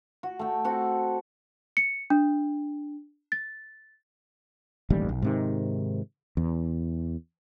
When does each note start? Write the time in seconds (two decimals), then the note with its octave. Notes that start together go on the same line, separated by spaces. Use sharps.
0.23 F#4
0.39 A3 G5
0.64 C4 F#4 A4
1.77 C#7
2.10 D4
3.32 A6
4.90 E1 A1 D#2 G3
5.09 B1
5.22 G#2 C3 D#3
6.37 E2